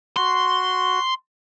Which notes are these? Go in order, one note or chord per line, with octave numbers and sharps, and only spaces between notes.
F#4 C6